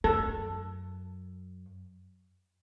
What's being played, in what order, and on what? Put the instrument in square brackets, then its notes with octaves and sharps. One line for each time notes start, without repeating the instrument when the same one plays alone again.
[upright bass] F#2 [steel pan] A4